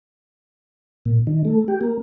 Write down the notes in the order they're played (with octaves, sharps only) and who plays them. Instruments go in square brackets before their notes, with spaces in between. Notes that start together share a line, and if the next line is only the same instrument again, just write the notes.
[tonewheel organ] A#2
D#3
A3
G4
A#3